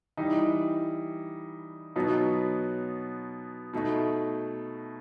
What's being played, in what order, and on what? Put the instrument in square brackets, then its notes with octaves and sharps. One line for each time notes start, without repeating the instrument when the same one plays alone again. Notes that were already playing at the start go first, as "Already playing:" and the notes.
[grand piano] E3 G3 D#4
B2 F#3 B3 D#4
B2 A3 D#4